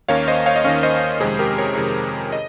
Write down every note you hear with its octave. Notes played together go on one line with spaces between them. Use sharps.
D#2 D#3 A#3 C#4 C#5 F5
C5 D#5
C#5 F5
D#5
D#2 D#3 A#3 C#4 C#5 F5
C5 D#5
F2 C3 D#3 G#3 G#4 C5
G4 A#4
A#4 C#5
F2 C3 D#3 G#3
D#5